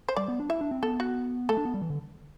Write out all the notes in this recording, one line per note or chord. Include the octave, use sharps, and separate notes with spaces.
C5
G3 D5
B3
D4
E4 E5
D4
C4
B3 A4
F#4
A3 A4
D4
B3
G3
E3
D3